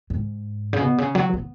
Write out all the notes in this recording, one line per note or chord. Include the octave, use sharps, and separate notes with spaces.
G#2
C#3
B2
C#3
F#3
B3